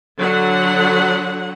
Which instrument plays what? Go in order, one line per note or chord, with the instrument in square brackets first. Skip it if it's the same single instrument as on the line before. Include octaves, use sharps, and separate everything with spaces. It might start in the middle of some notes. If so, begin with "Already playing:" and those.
[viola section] D3 F#3 F#5